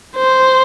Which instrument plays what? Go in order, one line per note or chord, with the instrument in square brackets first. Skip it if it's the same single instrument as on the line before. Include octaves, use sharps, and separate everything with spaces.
[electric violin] C5